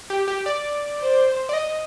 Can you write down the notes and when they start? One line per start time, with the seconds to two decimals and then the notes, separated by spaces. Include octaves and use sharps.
0.10 G4
0.28 G4
0.46 D5
1.00 C5
1.49 D5
1.53 D#5